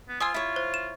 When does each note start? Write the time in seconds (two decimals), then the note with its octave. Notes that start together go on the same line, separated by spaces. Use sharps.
0.09 B3
0.20 F4 C5 G#5 C6 D#6 E6
0.34 E4 C#5
0.56 C5
0.74 E7